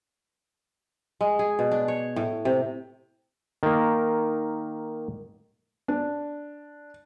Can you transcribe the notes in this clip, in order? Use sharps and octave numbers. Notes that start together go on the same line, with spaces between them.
G#3
G#4
B2
D4
C#5
A2
C3
D#3 A#3
D4